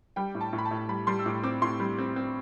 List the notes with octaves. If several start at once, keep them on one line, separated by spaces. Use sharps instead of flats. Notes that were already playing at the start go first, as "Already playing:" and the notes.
G3 G5
A2
A5
A2
B5
A5
A2
G3 B5
G3 C6
E6
A2 D6
C4 D6
A2 C6
G3
C4
C4